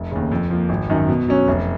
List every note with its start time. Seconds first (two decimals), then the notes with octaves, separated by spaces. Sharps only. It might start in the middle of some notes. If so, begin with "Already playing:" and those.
Already playing: F1
0.12 D#2 C#3
0.32 F2
0.50 F3 A#3
0.69 G#1
0.90 F#2 D#3
1.09 B2
1.28 F#3 C#4
1.48 F1